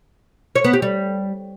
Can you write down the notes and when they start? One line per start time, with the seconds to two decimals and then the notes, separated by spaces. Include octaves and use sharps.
0.55 C#5
0.64 B3
0.73 G4
0.82 G3